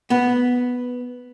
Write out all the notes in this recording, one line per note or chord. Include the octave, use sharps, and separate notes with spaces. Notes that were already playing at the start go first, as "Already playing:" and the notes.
B3